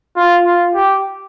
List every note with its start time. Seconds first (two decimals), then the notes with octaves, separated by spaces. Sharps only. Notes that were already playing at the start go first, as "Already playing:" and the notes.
0.16 F4
0.45 F4
0.74 G4